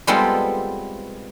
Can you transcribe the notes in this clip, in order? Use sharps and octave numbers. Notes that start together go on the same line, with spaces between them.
G3 G#3 B3 C4 F4 A4